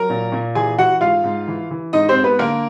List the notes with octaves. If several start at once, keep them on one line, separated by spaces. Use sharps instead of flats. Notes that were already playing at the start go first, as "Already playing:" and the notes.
Already playing: F#3 A#4 A#5
A#2
A#2
E3 G#4 G#5
E3 F#4 F#5
G#2 F4 F5
G#2
E3
E3
G#2 D#4 D#5
C4 C5
G#2
B3 B4
D3 A#3 A#4